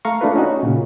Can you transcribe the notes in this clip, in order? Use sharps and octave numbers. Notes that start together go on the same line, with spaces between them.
A3 F5 A#5 C#6
A3 D4 F4 B4
C#4 D#4 F#4
A#2 C#3